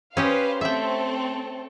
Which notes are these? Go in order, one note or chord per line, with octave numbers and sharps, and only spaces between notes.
C#4 G4 B4 C5 D#5 F5
A3 C4 A4 E5 G5